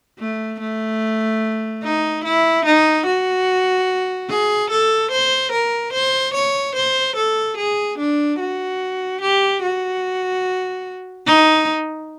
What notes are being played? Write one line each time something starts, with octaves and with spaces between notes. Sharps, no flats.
A3
A3
D#4
E4
D#4
F#4
G#4
A4
C5
A#4
C5
C#5
C5
A4
G#4
D4
F#4
G4
F#4
D#4